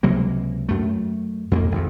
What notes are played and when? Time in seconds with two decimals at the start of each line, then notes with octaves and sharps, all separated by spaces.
0.03 C#2 C3 F#3 A#3
0.69 F#2 A3
1.51 F2 A3 A#3
1.72 G#1 F2